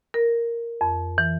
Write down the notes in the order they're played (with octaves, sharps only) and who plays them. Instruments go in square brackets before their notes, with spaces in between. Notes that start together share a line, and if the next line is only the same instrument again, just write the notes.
[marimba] A#4
F2
E3